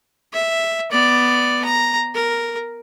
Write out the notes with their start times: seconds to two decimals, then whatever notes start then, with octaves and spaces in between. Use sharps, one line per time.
0.33 E5
0.91 B3 D5
1.65 A#5
2.15 A#4